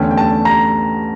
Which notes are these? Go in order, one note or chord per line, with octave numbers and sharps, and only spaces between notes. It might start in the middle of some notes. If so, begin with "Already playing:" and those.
Already playing: E2 D3 A3 C#4 G5
G5
A5
A#5